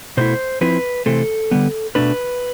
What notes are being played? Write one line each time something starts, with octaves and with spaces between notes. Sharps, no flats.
B2 A3 E4 C5
F3 C4 E4 B4
C3 E3 A3 C4 A4
D3 G3 B3
B2 A3 D4 B4